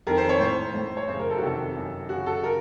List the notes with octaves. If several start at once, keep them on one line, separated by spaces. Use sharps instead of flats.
F2 D#3 A#4
C5
C#5
A2 C5
A2
C#5
F#2 C#3 C5
A#4
A4
F#4
F2 C3 D#3 A4
F#2 D#3
F#2 C#3 F#4
A4
C#3 A#4